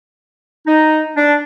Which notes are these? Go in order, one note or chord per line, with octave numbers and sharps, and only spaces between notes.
D#4
D4